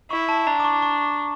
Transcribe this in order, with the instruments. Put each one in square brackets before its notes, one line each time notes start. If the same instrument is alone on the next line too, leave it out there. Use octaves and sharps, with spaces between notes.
[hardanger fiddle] E4 [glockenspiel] C#6
[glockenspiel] A5
[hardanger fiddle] D4 [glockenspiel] A#5
[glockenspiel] D6
C#6
C#6